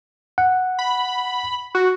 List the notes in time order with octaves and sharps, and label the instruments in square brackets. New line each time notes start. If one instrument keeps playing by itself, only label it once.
[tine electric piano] F#5
[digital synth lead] B5
F#4